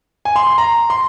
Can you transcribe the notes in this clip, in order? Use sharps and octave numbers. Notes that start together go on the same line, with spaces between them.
G#5
C6
C6
A#5
C6